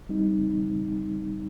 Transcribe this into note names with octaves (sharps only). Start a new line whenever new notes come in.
G3 C4 D#4